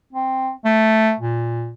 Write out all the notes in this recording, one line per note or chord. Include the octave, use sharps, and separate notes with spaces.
C4
A3
A#2